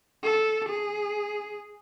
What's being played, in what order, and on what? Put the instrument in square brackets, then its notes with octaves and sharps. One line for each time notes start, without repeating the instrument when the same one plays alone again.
[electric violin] A4
G#4